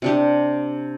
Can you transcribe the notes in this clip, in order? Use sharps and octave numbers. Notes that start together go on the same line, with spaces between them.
C3 D4 G4